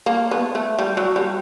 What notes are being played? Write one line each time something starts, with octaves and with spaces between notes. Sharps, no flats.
A#3
B3
A3
G3
F#3
G3